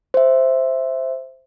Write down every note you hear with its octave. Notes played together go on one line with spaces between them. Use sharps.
C5 E5